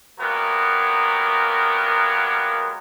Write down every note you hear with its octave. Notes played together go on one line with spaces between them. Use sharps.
F#3 G#3 A#3 B3 G4 A#4